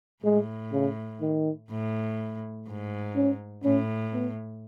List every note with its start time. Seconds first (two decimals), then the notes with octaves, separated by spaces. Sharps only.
0.24 A2 G#3
0.72 C#3
1.21 D#3
1.70 A2
2.67 G#2
3.16 C#4
3.64 A2 C#4
4.13 B3